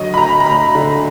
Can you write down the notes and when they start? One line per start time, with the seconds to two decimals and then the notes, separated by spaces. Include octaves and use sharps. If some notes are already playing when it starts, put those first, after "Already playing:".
Already playing: D3 F#3 D#5
0.14 B5
0.17 D2 A#5
0.40 A#5
0.46 D2 B5
0.75 D3